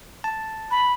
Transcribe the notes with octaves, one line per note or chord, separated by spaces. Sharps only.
A5
B5